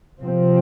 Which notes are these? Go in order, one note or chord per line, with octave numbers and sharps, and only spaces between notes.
C3 F3 C4